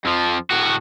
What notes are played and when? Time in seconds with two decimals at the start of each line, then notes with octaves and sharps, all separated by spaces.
0.05 F2 F3
0.51 A2 F#4